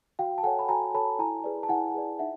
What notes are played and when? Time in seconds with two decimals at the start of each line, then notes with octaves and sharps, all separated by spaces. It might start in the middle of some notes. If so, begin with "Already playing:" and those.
0.19 F#4 F5 G5
0.38 A5
0.43 A4 C#5 F#5 G#5
0.59 B5
0.69 F#4 G#5 A#5
0.94 A4 C#5 A5 B5
1.19 E4 G#5 A#5
1.44 G#4 B4 D5
1.63 A5
1.69 E4 F#5 G#5
1.94 G#4 B4 D5
2.19 D#4 E5 F#5